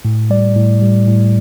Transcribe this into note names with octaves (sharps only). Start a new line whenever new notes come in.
A2
G3 D5
A2
G3
A2